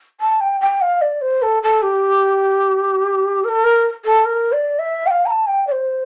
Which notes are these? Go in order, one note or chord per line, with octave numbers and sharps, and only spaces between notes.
A5
G5
G5
F5
D5
C5
A4
A4
G4
A#4
A4
A#4
A4
A#4
D5
E5
G5
F5
A#5
A5
G5
D5
C5